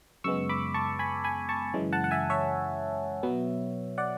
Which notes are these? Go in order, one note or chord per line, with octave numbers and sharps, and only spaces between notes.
F#2 C#3 G#3 B3 C#6 E6
B5 D6
A5 C#6
G#5 B5
G#5 B5
A5 C#6
F#2 C#3 E3 G#3
F#5 A5
F#5
E5 G#5
C#5 E5
B2 F#3 B3
D5 F#5